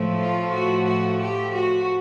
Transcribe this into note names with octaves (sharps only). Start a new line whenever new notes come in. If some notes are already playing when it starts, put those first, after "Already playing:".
Already playing: A2 F3 A3
F4
F#4
F#4
G4
F#4